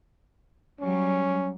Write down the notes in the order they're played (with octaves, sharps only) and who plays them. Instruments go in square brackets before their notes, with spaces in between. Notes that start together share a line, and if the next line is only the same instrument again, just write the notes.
[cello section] F#3 G3 [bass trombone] C#4